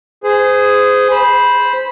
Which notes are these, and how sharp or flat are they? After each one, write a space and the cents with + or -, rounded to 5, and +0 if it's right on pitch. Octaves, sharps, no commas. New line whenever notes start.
G#4 +0 C5 -30
C5 +0 B5 -10